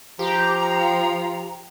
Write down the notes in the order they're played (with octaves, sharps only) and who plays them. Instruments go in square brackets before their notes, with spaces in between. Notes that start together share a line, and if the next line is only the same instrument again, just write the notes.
[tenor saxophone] F3 [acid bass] G4 [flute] A#5